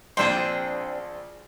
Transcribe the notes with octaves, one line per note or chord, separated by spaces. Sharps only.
A#1 C4 D4 G#4 C5 D5 G5 C6